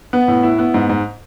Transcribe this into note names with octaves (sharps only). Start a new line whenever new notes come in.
B3
A2
E4
B3
G#2
G#2